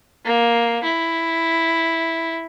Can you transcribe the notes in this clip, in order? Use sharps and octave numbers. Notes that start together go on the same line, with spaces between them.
A#3
E4